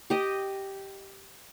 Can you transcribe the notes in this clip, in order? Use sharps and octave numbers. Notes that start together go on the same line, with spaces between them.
G4 D#5